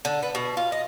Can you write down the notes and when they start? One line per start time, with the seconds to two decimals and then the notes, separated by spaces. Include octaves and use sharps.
0.05 D3
0.23 B3
0.35 B2
0.57 F4
0.72 D#5